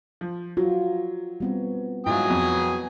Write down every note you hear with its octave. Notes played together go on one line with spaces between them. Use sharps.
F3
F#3 F4 F#4
G3 B3 C4
G#2 F#3 E4 F4 G#5 D#6
F2 B3